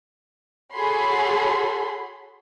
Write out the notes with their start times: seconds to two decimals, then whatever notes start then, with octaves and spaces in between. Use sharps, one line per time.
0.73 F#4 G#4 A4 C#5 B5 C6